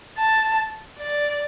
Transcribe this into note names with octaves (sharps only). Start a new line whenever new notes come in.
A5
D5